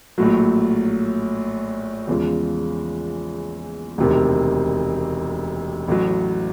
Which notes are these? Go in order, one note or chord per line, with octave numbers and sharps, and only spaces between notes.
A#1 A2 F#3
E2 C#3 F3 G#3
E1 D2 C3 D#3
A1 A2 F#3